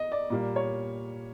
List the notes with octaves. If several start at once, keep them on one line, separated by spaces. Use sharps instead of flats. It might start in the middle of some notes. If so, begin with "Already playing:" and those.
Already playing: D#5
D5
A#2 G3 A#3
C#5